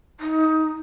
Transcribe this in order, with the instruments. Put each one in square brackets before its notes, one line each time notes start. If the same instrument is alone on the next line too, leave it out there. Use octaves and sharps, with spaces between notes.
[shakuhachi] D#4